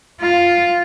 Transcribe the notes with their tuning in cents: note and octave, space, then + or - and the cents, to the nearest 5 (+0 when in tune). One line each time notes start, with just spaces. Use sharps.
F4 +0